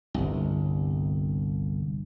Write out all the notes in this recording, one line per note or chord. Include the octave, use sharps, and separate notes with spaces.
G1 C2